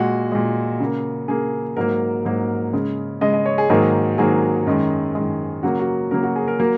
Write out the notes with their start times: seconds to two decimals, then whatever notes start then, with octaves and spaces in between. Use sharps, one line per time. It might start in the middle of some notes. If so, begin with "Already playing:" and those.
Already playing: A#2 G#3 F#4
0.32 A#2 G#3
0.80 C#3 A#3
1.28 C#3 A#3 G#4
1.77 G#2 F#3 A#3 A#4
2.25 G#2 F#3 A#3
2.73 C#3 G#3
3.21 C#3 G#3 D#5
3.33 D#5
3.46 C#5
3.58 G#4
3.70 G#2 D#3 F#3 A#3 G#4
4.18 G#2 D#3 F#3 A#3 G#4
4.67 F#2 D#3 G#3
5.15 F#2 D#3 G#3
5.63 C#3 F#3 A#3 F#4
5.79 F#4
6.11 C#3 F#3 A#3 A#4
6.23 F#4
6.36 G#4
6.48 A#4
6.59 F#3 A#3